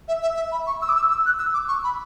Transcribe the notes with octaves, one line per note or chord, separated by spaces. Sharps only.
E5
E5
E5
B5
C#6
E6
D6
E6
E6
F#6
E6
D6
C#6
B5